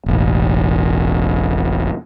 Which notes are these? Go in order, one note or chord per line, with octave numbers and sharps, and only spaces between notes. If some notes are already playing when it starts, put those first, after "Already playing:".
E1 A1